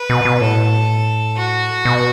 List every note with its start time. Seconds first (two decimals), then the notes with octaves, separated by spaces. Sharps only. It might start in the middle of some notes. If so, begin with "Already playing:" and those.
Already playing: B4
0.09 B2
0.25 B2
0.41 A2 A4
1.37 F#4
1.85 B2